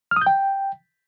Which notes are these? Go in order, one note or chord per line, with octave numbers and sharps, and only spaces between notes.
F6
D#6
G6
G5